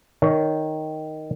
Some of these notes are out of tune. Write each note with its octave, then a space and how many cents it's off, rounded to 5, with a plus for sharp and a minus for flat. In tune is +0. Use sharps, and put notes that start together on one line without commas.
D#3 +0 C#5 +15